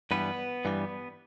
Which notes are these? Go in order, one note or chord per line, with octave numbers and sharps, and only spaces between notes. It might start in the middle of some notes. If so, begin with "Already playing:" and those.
G2 E3 G3 B3 B4
G2 E3 G3